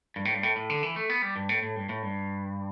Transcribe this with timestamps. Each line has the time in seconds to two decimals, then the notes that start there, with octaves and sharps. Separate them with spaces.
0.16 G2
0.25 A2
0.35 G2
0.43 A2
0.56 A2
0.70 D3
0.83 E3
0.96 A3
1.09 B3
1.22 G3
1.36 G2
1.49 A2
1.63 A2
1.76 G2
1.89 A2
2.02 G2